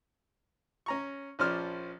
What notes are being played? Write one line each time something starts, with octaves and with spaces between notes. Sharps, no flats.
C#4 A#5 C#6
A#1 F3 C#4 C5 D5 F6